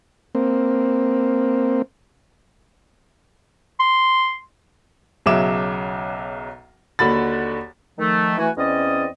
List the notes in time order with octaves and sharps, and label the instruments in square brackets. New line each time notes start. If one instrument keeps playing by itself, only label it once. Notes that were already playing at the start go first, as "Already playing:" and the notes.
[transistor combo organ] A#3 C4
[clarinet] C6
[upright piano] B1 C#3 F#3 E5 D6 E7
D#2 D3 F#4 B5 A6
[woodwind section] D#3 F3 A3
E3 A3 F#4 G#5
E2 C4 C#4 D5 D#5